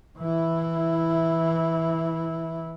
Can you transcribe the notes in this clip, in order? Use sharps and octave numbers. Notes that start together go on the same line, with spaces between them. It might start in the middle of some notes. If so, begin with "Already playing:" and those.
E3 E4